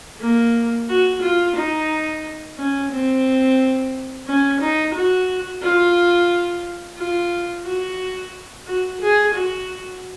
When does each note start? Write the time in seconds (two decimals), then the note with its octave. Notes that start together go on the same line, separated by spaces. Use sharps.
0.21 A#3
0.89 F#4
1.22 F4
1.56 D#4
2.58 C#4
2.92 C4
4.27 C#4
4.60 D#4
4.94 F#4
5.62 F4
6.98 F4
7.65 F#4
8.67 F#4
9.01 G#4
9.34 F#4